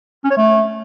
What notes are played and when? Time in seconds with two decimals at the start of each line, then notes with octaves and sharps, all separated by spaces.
0.24 C#4
0.30 C#5
0.37 A3